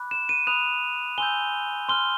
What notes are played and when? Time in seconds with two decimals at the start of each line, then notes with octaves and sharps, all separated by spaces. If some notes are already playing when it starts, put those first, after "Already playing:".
Already playing: B5 D6 F#6
0.11 E7
0.29 D#7
0.47 B5 D#6 F#6 F7
1.18 G#5 C6 E6 G6 G7
1.89 C6 F6 G7